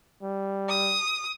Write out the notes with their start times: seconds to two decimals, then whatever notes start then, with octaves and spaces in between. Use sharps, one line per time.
0.22 G3
0.69 D#6